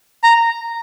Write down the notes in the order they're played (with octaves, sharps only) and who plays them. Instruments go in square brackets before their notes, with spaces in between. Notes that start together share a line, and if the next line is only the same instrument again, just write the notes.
[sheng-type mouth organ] A#5